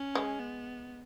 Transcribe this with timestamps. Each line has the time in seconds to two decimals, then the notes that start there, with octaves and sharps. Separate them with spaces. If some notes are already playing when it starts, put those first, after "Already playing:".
Already playing: C#4
0.15 G#3
0.40 B3